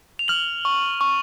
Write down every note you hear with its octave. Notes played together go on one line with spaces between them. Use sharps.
F7
F6 F#7
C#6
C#6